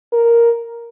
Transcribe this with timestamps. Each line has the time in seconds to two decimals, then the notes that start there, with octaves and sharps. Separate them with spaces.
0.13 A#4